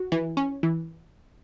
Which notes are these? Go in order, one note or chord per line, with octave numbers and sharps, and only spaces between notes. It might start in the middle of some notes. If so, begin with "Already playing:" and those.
Already playing: F#4
E3
C#4
E3